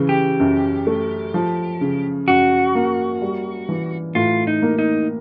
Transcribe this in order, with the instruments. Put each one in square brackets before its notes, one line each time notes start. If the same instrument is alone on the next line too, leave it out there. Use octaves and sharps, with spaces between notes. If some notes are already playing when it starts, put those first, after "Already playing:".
Already playing: [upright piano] C#3 E3
[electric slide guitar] G4
[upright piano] F#2
A3
F3
C#3
[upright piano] F#2 [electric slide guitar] F#4
[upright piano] A#3
G3
E3
[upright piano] A2 [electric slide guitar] F4
[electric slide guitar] D#4
[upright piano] A#3
[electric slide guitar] D#4